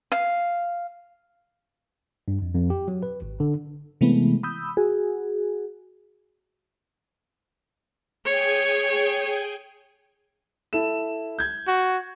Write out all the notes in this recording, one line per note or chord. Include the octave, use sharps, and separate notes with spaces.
F5
G2
F2
F2
G4
F#3
B4
G#1
D3
C3 E3 G#3 A3 B3
B5 D#6 E6 G6
F#4 G#4
G#4 C#5 G5 G#5
E4 A4 E7
G6 G#6
F#4